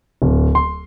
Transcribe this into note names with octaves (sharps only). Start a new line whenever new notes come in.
D1
C6